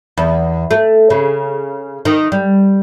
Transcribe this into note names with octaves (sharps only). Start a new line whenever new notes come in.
E2
A3
C#3
D#3
G3